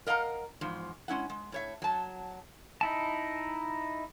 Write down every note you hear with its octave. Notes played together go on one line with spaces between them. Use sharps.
A#4 D#5 F5 F#5 A#5
E2 G#2 F3
G#3 C#4 E4 F#5
G#3
A2 C#5 E5
F#3 A5
D#4 E4 A5